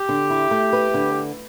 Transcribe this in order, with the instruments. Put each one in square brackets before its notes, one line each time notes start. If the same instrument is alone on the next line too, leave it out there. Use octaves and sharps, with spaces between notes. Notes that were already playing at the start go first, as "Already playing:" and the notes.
Already playing: [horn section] G4
[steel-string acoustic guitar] D3
E4
A3
B4
D3